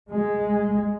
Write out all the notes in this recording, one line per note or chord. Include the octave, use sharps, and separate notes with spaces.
G#3